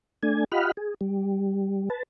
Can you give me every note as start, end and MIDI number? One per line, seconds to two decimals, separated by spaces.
0.23 0.44 57
0.23 0.44 62
0.23 0.44 80
0.52 0.72 65
0.52 0.72 67
0.52 0.72 75
0.52 0.72 78
0.52 0.72 83
0.52 0.72 89
0.77 0.94 68
1.01 1.89 55
1.90 2.03 71
1.90 2.03 81